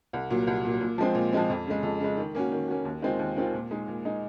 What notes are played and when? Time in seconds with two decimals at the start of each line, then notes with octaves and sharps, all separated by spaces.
0.13 C2
0.30 A#2 F#3
0.47 C2
0.65 A#2 F#3
0.81 A#2
0.98 F3 G#3 C4
1.15 A#2
1.33 F3 G#3 C4
1.50 F2
1.67 C#3 G#3
1.83 F2
2.00 C#3 G#3
2.17 D#3
2.35 A#3 C#4 F#4
2.52 D#3
2.68 A#3 C#4 F#4
2.85 D#2
3.02 D#3 G#3 C4 F4
3.19 D#2
3.36 D#3 G#3 C4 F4
3.53 A#2
3.71 G#3 D#4
3.88 A#2
4.05 G#3 D#4